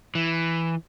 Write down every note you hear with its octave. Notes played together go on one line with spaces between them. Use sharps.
E3